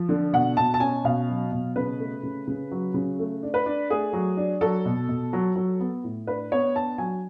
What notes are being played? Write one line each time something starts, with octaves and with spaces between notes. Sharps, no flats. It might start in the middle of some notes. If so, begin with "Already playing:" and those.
Already playing: F3
D3
B2 F#5
B2 A5
A5
C#4 G#5
B2 F5
F#3
B2
C#3 B4
A3
C#3
C#3
F#3
C#3
A3
D4
B4
D4
A3 G#4
F#3
D4
F#3 A4
B2
B2
F#3
F#3
B3
A2
D4 B4
B3 C#5
D4 A5
F#3 G#5